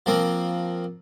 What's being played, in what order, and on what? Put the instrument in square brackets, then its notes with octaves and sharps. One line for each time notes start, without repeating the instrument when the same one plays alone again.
[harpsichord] F3 A#3 C4